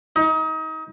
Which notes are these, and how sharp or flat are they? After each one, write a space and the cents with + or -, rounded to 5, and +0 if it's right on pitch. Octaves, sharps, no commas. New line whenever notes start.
D#4 +30